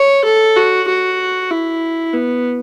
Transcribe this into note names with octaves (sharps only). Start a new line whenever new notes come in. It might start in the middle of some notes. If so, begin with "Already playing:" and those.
Already playing: C#5
A4
F#4
F#4
E4
B3